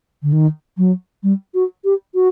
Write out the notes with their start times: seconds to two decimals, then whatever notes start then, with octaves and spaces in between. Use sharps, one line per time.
0.23 D3
0.32 D#3
0.78 F#3
1.23 G3
1.54 F#4
1.85 G4
2.15 F#4